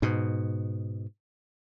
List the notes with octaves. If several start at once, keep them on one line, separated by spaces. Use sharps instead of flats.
G#2 B2